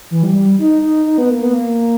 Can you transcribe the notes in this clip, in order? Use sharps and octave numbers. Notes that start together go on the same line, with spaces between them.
E3
G3
G3
D#4
D#4
D#4
B3
A#3
B3
A#3